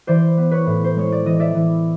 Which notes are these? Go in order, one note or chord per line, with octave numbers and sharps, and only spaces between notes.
E3 C5 D5
B3
B4 C#5
A2
C5
G#3 C#5
D5
E3 D#5
D5 E5
E3